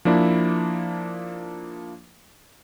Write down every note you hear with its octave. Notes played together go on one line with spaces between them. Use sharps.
F3 A#3 D4 E4